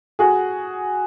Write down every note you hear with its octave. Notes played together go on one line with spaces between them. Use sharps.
F#4 G#4